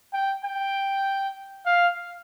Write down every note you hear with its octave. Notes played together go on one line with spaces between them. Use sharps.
G5
G5
F5